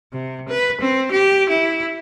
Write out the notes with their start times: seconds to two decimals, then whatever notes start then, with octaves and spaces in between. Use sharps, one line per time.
0.13 C3
0.49 B4
0.81 C4
1.12 G4
1.49 E4